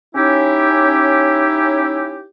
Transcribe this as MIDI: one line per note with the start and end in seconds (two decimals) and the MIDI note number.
0.16 2.24 61
0.16 2.24 63
0.16 2.24 64
0.16 2.24 67